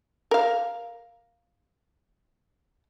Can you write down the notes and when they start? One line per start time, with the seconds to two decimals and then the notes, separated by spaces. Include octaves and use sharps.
0.31 A#4 F5